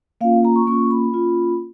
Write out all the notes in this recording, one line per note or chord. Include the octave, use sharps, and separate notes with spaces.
A#3 C#4 F4 F5
A#5
C#6
A#3 C#4 F4 C#6
B5
A#3 C#4 F4